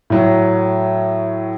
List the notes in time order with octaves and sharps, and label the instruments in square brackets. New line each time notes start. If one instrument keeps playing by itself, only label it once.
[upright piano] A2 F#3